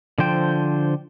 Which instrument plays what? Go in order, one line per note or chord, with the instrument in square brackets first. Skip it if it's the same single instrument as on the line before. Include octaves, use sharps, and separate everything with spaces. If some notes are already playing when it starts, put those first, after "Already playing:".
[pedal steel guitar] D3 F3 C5 G5